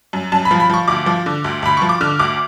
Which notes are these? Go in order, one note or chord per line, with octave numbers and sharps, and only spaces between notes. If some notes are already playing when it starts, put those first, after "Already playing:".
F#2
F#2 A5
B5
F3
B5
F3 C#6
D2 D6
F3
D3
D2
D2 B5
F3 C#6
D6
D3 F6
D2 D6